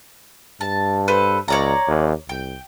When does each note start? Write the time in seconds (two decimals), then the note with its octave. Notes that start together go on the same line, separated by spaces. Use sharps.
0.61 G2 A5
1.08 A4 B4 C5
1.48 C#2 C#5 D5 A#5
1.87 D#2
2.29 C2 G5